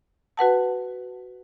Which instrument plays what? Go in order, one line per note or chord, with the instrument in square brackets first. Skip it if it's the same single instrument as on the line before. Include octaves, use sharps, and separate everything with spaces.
[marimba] F#4 B4 F#5 A5